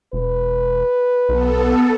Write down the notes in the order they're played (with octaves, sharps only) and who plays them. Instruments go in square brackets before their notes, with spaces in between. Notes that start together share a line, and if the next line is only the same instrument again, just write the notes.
[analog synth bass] E1 [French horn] B4
[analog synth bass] B1 [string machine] B3 A4